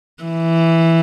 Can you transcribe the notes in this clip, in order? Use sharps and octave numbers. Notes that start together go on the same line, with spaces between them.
E3